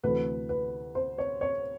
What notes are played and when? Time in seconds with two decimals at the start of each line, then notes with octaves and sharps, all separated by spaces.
0.03 D2 C3 E3 A3 B4
0.49 B4
0.95 C5
1.18 C#5
1.41 C#5